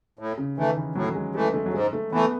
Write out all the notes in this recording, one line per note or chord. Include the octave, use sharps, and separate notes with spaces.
A2
C#3
D#3 E3 A3
E3
A2 F#3
G#3
E3 G#3 A3
A3
F#3
G#2 G#3
A3
E3 A3 B3